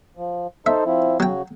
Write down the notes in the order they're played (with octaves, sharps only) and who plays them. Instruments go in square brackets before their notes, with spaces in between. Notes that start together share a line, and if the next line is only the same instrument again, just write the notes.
[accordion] F3
[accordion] D#4 A4 C5 [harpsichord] E5
[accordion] F3 C4 E4
[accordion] C#3 F#4 [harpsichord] F#3 G5